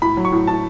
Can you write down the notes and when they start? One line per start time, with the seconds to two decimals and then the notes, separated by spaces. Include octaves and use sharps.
0.02 A2 B5
0.17 F#3
0.25 C#6
0.32 A2
0.47 A2 A5